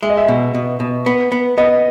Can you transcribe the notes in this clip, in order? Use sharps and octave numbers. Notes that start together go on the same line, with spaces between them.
G#3 E5
D#5
E5
B2
B2
B2
B3
B3
B3 D#5